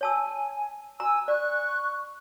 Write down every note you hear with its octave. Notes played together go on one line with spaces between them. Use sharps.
C#5 G#5 A5 E6
G#5 A#5 E6
D5 C#6 F#6